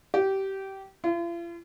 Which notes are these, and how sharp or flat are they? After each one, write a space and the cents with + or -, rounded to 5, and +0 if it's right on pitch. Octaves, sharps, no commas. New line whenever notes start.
G4 -20
F4 -45